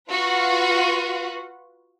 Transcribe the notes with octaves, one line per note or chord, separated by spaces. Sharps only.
F4 F#4 B4